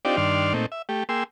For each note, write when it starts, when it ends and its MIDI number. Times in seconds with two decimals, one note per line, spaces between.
0.05 0.17 60
0.05 0.17 62
0.05 0.17 63
0.05 0.17 65
0.05 0.17 67
0.05 0.17 74
0.17 0.53 43
0.17 0.53 51
0.17 0.53 62
0.17 0.53 74
0.17 0.53 84
0.17 0.53 89
0.53 0.66 46
0.53 0.66 57
0.53 0.66 60
0.53 0.66 63
0.72 0.82 76
0.89 1.03 57
0.89 1.03 67
1.09 1.24 58
1.09 1.24 68
1.09 1.24 79
1.09 1.24 84
1.09 1.24 88